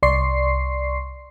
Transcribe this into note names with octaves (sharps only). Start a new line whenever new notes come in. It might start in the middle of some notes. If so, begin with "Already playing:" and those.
C2 D5 C6 C#6 C7